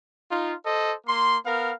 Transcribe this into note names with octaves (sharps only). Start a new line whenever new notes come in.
D#4 F4
A4 C5 D#5
A#3 C6
B3 A#4 F5